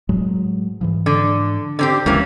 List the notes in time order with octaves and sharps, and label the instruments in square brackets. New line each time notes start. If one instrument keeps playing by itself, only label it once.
[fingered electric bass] A2 F#3 G#3
G#2 E3 F3
[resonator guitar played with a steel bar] D3
D3 C4 G4
[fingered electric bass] D2 G#3 [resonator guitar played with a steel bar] E3 A#3 C#4